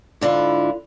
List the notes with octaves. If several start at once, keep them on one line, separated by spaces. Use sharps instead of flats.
G#2 D3 E4 F4